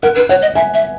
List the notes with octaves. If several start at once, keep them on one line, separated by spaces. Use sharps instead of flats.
A#4 F#5
B4
C#5 F#5
D#5
E5 G#5
E5